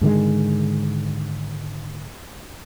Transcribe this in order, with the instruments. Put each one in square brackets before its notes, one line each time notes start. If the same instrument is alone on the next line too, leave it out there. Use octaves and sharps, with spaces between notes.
[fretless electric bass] G#2 D3 D#3 G#3